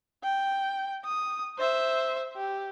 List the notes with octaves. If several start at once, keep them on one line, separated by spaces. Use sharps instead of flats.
G5
D#6
C5 E5
G4